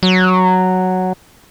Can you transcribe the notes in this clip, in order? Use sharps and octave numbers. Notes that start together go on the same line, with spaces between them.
F#3